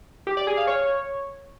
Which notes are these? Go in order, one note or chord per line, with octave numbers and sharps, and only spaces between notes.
G4
D5
G#4
F5
C#5